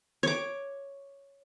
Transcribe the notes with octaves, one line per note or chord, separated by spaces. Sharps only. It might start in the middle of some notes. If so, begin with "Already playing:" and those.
C#5 D6